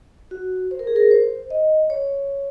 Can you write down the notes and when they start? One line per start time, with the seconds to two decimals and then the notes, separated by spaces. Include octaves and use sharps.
0.31 F#4
0.71 C5
0.79 A#4
0.87 G#4
0.96 A#4
1.11 C5
1.50 D#5
1.90 C#5